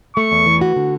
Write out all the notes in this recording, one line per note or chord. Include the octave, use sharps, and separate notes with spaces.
A3 C#6
E2
E3
F#4
D3